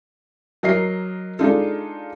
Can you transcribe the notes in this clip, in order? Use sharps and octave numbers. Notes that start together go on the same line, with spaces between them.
F#3 A#4 D#5 C7
G#3 D4 D#4 F4 A4